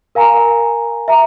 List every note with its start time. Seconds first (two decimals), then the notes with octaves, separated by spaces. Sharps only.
0.15 A#4 F5 G#5 A#5
1.08 E5 A#5